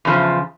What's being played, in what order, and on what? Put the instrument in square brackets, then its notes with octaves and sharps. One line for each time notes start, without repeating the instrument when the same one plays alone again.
[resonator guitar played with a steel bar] E2 C#3 F3